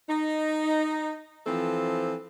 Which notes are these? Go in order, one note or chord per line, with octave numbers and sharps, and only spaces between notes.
D#4
E3 F3 C4 A4